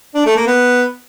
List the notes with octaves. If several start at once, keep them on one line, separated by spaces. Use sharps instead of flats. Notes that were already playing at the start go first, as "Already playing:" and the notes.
D4
A3
A#3
B3